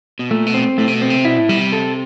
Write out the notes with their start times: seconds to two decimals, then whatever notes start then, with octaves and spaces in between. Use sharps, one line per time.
0.19 B2
0.31 A#2 A3
0.47 B2
0.54 C4
0.78 A2 A3
0.88 C3
0.94 B2
1.02 C4
1.10 C3
1.25 B2 E4
1.38 A2
1.49 B2 G3
1.61 C3
1.73 A4